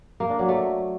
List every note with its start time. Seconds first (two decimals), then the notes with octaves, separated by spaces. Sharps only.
0.20 A#3
0.30 D4
0.39 F#3
0.49 A3